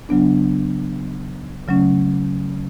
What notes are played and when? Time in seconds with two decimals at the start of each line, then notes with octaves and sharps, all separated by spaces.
0.09 C#3 F#3 B3 D4
1.68 C#3 F#3 A3 C#4